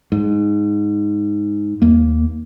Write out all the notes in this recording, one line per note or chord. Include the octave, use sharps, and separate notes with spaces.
G#2
D#2 A#3